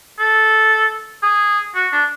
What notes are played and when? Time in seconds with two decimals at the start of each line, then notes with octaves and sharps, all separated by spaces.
0.20 A4
1.23 G#4
1.75 F#4
1.92 D4